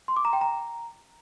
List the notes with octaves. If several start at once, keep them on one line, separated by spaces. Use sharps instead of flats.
C6
D6
A#5
G5
A#5